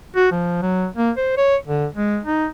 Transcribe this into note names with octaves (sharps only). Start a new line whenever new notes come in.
F#4
F3
F#3
A#3
C5
C#5
D3
G#3
D#4